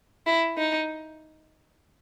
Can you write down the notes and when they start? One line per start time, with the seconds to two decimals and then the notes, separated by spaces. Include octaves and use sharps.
0.26 E4
0.57 D#4